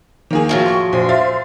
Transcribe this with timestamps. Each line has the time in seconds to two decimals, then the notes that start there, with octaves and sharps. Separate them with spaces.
0.31 D#3 A#3 G#4
0.49 A2 F3 F#3
0.66 C6 C#6
0.93 A#1 C5
1.09 E5 F5 A6